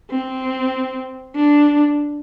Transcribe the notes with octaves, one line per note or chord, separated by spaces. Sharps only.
C4
D4